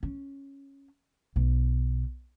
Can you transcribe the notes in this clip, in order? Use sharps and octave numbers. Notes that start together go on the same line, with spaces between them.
C#4
B1